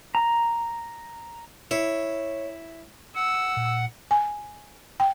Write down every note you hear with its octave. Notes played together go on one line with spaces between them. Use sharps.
A#5
E4 C#5
F#5 E6
A#2
G#5
G5